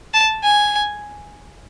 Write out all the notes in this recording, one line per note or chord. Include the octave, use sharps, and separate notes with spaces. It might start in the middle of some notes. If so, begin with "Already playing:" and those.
A5
G#5